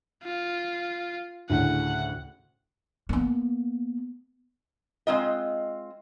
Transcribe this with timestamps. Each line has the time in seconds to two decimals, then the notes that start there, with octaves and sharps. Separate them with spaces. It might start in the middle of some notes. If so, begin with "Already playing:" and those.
0.23 F4
1.50 D2 A2 C#3 F#5
3.09 A#3 B3
5.07 G#3 C4 F4 D#5